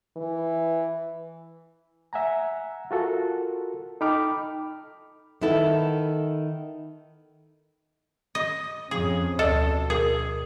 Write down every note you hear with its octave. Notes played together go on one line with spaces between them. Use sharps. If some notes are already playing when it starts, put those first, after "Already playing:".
E3
E5 F#5 G#5 A#5
F4 F#4 A4 A#4
D#4 A4 G5 B5 D6 F6
D#3 B3 E4 A4
D#5
F2 F3 C#4 G#4
D2 B2 A4 D5
G#4 A#4